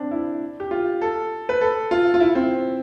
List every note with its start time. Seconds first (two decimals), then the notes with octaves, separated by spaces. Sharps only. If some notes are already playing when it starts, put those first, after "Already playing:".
Already playing: C4 D4
0.11 E4
0.60 G4
0.71 F4
1.01 A4
1.49 B4
1.61 A4
1.91 F4
2.14 F4
2.20 E4
2.35 C4